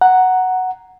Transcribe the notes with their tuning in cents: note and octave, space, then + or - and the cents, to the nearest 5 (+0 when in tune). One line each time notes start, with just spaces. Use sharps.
F#5 +0 A#5 +0